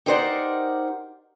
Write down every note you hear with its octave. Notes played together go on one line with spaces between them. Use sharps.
D#4 G4 A#4 C5 D5 F#5